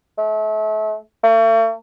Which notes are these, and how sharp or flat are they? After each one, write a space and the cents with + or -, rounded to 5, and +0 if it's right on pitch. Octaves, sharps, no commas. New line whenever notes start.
A3 -35
A3 +45